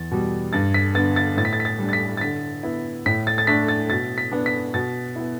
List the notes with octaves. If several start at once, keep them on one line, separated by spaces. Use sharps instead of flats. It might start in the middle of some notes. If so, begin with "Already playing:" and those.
Already playing: E2 A6
B2 G3
G2 A6
B6
D3 B3 A6
A6
A2 A6
B6
A6
B6
A6
G3 D4
A6
B6
A6
D3 B6
B3 E4
A2 B6
A6
A6
A3 D4 B6
A6
B2 A6
B6
B3 D4
B6
B2 A6
B3 E4